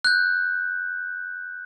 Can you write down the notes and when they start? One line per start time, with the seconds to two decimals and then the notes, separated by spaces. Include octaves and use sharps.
0.05 F#6 G6